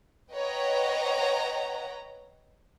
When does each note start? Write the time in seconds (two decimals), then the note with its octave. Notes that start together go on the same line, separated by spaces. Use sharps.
0.33 B4 C#5 D#5 F#5 G5 A#5